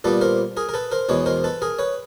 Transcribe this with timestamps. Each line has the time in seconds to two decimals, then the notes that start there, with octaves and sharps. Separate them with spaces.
0.04 A#2 G3 B3 A4 B4
0.21 A#4 C5
0.57 G#4 A#4
0.69 A#4
0.74 A4 B4
0.92 A#4 C5
1.09 E2 B2 G#3 B3 B4 C#5
1.26 A#4 C5
1.44 A4 B4
1.62 G#4 A#4
1.79 B4 C#5